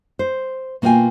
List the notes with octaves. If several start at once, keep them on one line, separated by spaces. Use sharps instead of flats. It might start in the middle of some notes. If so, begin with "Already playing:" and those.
C5
B2 A#3 F4 C#5 G5 G#5